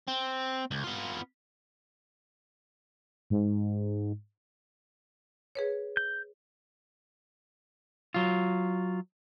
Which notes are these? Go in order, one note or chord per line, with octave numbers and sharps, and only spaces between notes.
C4
C#2
B3 F4
G#2
G#4 B4 C#5
G6
F#3 F4